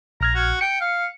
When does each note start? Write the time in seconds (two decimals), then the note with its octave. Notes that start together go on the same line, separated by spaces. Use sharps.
0.21 A#1 A#5 F6 G#6
0.35 F#4
0.61 G5 C#7
0.81 F5